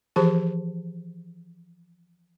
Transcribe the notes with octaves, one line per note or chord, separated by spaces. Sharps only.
E3 F3 G4 G#4 C5 A5